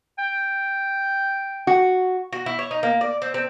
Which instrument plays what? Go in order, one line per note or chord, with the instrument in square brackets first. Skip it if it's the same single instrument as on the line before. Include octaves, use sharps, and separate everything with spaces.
[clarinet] G5
[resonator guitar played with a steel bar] F#4
[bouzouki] F#4
E4
C#5
D#4
A#3
D5
C4
C4